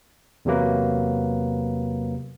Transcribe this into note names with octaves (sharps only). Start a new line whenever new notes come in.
E2 C3 F#3 A#3 B4